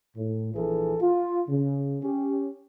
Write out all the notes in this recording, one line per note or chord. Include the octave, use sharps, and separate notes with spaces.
A2
A#1 E3 G#4 A4
F4
C#3
C#4 G4